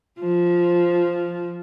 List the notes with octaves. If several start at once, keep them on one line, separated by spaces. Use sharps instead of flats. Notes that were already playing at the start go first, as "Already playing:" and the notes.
F3